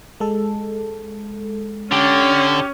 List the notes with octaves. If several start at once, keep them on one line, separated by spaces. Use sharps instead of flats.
G#3 A4
D3 C#4 G4